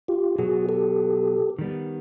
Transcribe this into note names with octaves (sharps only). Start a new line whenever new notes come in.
F4 G4
B2 F#3 B3 F#4 G#4
G4 A4
D#3 G3 B3